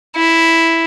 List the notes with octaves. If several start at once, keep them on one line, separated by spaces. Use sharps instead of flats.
E4